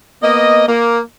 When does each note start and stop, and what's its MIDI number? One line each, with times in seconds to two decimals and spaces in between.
0.23 0.64 58
0.23 0.64 59
0.23 0.64 75
0.68 1.00 58